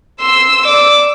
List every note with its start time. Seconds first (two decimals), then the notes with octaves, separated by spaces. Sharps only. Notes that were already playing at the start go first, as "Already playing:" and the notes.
0.21 C6 E6
0.66 D5 D6